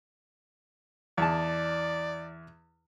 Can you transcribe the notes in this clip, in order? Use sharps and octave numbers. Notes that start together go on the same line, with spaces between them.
E2 D5 A5